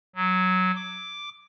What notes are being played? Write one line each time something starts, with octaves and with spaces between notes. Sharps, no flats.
F#3
D6